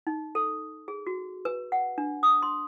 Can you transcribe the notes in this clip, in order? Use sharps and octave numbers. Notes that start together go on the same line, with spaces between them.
D#4
A4
G#4
F#4
B4
F#5
D4
D#6
C6